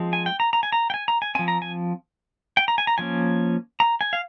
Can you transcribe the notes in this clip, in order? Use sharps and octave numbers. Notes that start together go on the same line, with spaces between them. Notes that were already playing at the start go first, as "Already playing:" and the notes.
Already playing: F3 G#3 C4
G#5
G5
A#5
A#5
G#5
A#5
G5
G#5
A#5
G#5
F3 C4 G#5
A#5
G#5
G5
A#5
G#5
A#5
F3 A#3 C#4 G#5
A#5
G#5
F5